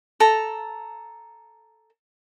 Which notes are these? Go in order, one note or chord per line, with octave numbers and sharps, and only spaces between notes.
A4 A#5